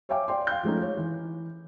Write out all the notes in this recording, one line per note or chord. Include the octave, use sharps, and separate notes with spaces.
C#5 E5 F5 G5 G#5 D6
D5 G5 C6
F5 C6 G6
F3 G#3 A3 C#4 D#4
C#5
E3